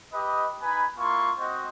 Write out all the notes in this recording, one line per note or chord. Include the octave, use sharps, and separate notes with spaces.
G4 B4 D#5
D#4 B4 G#5 B5
A#3 E4 F4 C6 C#6
C4 F#4 C5 D#5